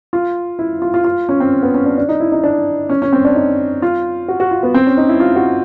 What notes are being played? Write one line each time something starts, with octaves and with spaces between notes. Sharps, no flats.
F4
E4
F4
F4
F4
C#4
C4
B3
C#4
D4
D4
D#4
E4
D#4
D4
C#4
C#4
C4
D4
D#4
F4
F#4
F#4
F4
B3
C4
C#4
D#4
E4
F4
F#4